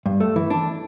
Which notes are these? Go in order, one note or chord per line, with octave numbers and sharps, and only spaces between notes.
G2
A3
E3
D4